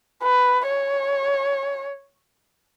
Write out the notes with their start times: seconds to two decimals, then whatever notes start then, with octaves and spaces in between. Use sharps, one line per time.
0.23 B4
0.67 C#5